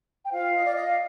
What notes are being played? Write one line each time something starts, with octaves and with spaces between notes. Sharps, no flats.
G5
F4 C5 F5
D#5
D5
D#5
F5